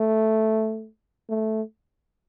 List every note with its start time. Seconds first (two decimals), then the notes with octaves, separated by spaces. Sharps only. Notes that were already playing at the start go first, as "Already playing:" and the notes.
Already playing: A3
1.29 A3